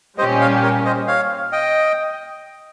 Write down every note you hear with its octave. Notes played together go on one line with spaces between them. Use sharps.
A#2 G3 C#4 G4 C5 D#5
C#5 F5
A#4 C#5
C5 D#5
C#5 F5
D#5 G5